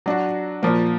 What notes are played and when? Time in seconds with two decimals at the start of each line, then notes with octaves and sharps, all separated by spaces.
0.06 F#3 D4 F#4
0.63 A#2 F3 A#3